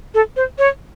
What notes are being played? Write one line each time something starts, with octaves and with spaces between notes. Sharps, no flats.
A4
C5
C#5